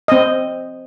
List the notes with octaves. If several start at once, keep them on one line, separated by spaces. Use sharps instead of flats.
C4 D#5